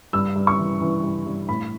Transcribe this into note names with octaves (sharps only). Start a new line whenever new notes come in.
G2 E6
G2
C#6
E3
E3
G2
G2
A2 B5